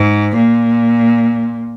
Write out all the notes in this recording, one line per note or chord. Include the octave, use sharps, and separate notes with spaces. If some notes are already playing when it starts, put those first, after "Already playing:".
Already playing: G#2
A#2